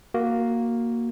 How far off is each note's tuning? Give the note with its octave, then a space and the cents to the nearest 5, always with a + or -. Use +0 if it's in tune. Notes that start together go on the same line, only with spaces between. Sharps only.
A#3 +0 F#4 +0